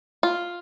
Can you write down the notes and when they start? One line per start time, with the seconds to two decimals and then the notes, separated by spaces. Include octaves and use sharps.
0.23 F4